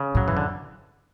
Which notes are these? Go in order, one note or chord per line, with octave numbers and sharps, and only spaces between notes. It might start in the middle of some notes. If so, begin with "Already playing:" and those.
Already playing: C#3
A2 F#3
F#2 E3
D3